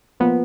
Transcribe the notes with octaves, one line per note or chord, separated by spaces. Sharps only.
A#2 F3 B3